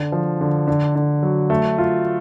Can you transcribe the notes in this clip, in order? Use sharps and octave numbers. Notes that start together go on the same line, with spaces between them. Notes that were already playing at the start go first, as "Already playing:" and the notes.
Already playing: D3
F3
D3
D3
D3
F#3
A3
F4